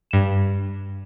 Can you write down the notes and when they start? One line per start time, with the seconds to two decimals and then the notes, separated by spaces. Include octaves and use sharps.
0.11 G2 E7